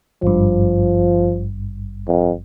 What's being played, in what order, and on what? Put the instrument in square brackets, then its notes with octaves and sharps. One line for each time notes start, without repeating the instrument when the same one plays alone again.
[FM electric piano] G#1 G2 [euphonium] F3
[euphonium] F2